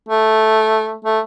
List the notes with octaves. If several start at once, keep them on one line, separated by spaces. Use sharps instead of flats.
A3
A3